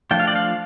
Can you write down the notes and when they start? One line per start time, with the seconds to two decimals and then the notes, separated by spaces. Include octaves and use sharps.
0.11 F3 A3 D4 F4 G5
0.20 F5
0.27 D5
0.36 F5